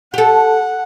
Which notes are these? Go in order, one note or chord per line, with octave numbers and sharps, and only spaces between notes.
G4 A4 F#5